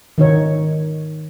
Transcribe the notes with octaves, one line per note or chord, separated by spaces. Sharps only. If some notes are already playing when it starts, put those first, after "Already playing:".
D#3 D#4 C#5